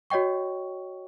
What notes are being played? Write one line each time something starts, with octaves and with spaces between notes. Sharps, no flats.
F#4 C#5 D#5 G5 C#6